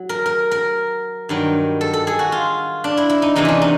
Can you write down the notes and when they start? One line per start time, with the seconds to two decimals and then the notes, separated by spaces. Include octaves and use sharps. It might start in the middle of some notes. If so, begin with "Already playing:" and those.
Already playing: F#3
0.09 A#4
0.26 A#4
0.51 A#4
1.29 G2 D#3 F#3
1.81 A4
1.93 A4
2.07 G#4
2.19 F#4
2.32 F4
2.84 D4
2.97 E4
3.09 E4
3.22 D#4
3.36 E2 C3 E3 D#4
3.45 C#4 D4
3.62 D#4